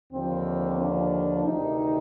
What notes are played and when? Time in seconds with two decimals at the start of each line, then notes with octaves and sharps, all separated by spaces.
0.12 D#2 D3 F3 C4
0.78 D4
1.44 D2 C3 D#3 D#4